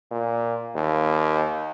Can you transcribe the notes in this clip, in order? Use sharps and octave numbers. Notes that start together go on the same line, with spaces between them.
A#2
D#2